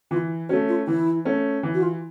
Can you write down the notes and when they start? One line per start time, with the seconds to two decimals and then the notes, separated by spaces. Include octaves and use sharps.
0.11 E3 F4
0.49 A3 C#4 F#4
0.68 F4
0.87 E3 E4
1.25 A3 C#4
1.63 E3
1.74 F#4
1.82 F4